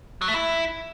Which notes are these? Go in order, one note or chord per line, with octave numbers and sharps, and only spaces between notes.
F#3
A3
E4